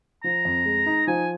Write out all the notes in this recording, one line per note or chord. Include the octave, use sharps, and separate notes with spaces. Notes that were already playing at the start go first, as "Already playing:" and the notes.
F3 A#5
F2
G#3
D#4
F3 G#5